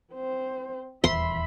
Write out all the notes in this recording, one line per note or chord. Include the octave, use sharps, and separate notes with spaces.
C4 C5
D#1 E2 E5 B5 C6